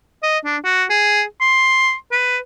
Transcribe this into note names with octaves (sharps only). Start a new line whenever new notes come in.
D#5
D4
F#4
G#4
C6
B4